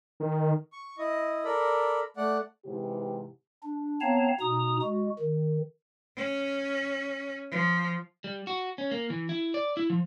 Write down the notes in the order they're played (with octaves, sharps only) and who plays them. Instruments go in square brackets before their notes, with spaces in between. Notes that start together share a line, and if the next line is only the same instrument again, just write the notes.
[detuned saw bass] D#3
[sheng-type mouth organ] C#6
E4 D#5
A4 A#4 D5 B5
A3 D5 F#5
[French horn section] G#2 C3 E3 G4
[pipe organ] D4
B3 C4 C#5 F5 A5 A#5
B2 D#4 A#5 D#6
G#3 F#4
D#3
[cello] C#4
F3
[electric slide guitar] G3
F#4
C#4
A#3
E3
E4
D5
E4
F3